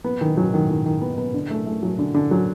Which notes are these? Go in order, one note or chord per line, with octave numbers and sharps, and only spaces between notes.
B3
D#3
F#3
D#3
D#3
D#3
B3
B3
D3
A3
A3
F#3
D3
D3
F#3